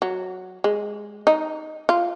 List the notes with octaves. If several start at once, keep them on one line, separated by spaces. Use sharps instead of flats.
F#3
G#3
D#4
F4